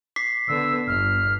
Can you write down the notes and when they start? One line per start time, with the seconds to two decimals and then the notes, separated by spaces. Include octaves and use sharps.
0.16 D6 B6 C7
0.48 D3 B3 E6
0.87 G1 F6